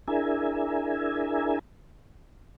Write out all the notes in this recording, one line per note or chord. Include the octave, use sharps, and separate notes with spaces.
D4 E4 G#4 A#4 E5 G#5